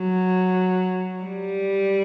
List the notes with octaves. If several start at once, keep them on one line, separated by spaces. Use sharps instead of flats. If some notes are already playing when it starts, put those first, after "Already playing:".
Already playing: F#3
G3